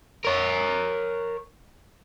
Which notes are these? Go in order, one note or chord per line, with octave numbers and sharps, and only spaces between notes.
A#4 C#5